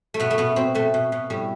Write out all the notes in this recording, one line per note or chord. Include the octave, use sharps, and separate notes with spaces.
A3
B2 B3
A3
B2 B3
B2 C4
B2 A3
B2
B2
A2 G3